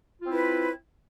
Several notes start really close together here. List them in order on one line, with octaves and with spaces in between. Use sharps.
F4 C4 E4 B4